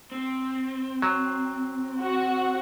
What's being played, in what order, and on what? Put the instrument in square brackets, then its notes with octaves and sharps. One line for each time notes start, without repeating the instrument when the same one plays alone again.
[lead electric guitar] C4
[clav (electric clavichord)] F#3
[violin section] F#4 F#5